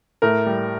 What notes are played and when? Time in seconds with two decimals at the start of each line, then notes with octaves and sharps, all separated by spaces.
0.22 A2 A#4
0.46 G3